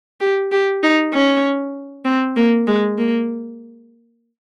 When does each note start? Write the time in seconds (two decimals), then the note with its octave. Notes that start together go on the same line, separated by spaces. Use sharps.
0.21 G4
0.52 G4
0.83 D#4
1.14 C#4
2.05 C4
2.36 A#3
2.67 G#3
2.98 A#3